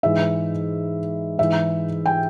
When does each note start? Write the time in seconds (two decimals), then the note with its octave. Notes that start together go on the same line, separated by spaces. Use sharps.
0.03 G#2 E3 E5
1.38 G#2 E3 E5
2.06 G5